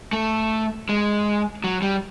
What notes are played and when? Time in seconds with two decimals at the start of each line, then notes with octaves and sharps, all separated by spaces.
0.13 A3
0.89 G#3
1.64 F#3
1.82 G3